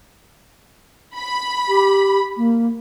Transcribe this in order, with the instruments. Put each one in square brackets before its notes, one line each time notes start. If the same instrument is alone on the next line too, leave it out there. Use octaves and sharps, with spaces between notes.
[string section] B5
[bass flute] G4
A#3